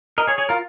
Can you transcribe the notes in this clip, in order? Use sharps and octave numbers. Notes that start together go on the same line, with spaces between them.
A#4 D#5
G#4 C#5
G#4 C#5
F4 A#4